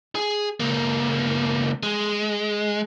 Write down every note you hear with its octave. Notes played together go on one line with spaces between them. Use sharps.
G#4
C#2 A#3
G#3